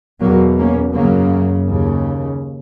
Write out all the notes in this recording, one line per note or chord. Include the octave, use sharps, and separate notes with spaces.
E2 B2 F#3 A#3
A#3 C#4
F#2 C#3 F#3 A#3
D#2 C#3